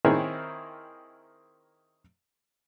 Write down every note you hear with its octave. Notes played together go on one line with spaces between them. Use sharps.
D#3 C4 E4 G#4 A#4 C#5